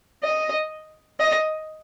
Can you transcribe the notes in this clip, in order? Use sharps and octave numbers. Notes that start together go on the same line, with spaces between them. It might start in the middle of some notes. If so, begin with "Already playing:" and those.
D#5
D#5